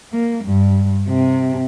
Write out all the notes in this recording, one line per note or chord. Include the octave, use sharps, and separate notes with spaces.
A#3
G2
C3